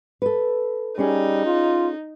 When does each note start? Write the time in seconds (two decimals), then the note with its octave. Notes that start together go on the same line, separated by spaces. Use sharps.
0.22 A4 B4
0.99 G3 C#4 D#4 G#4
1.46 F4